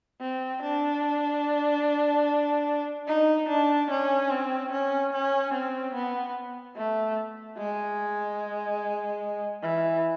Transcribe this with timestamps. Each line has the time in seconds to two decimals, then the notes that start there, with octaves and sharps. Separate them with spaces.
0.21 C4
0.62 D4
3.08 D#4
3.49 D4
3.90 C#4
4.31 C4
4.72 C#4
5.13 C#4
5.54 C4
5.95 B3
6.77 A3
7.58 G#3
9.63 E3